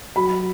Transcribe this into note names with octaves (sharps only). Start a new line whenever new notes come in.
F#3 B5